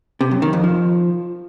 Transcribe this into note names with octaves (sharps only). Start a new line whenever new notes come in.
C3
F#2
D#3
F2
F3